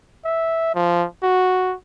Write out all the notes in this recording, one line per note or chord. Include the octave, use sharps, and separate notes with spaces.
E5
F3
F#4